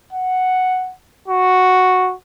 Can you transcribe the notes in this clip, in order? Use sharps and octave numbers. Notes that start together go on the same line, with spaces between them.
F#5
F#4